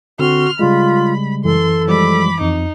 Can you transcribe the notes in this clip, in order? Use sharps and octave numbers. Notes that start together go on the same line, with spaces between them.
D3 C4 F#4 C6 F6
C#3 G3 G#3 F4 B5
F#2 E3 A4 C6
F3 G3 G#3 B5 D6
F2 D#4